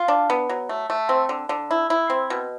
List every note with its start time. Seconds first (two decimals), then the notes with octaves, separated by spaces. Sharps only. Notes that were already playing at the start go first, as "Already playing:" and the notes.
Already playing: F4
0.08 D4
0.30 B3
0.49 F#3
0.69 A3
0.90 A3
1.09 C4
1.29 D3
1.49 D3
1.71 E4
1.90 E4
2.10 C4
2.30 B2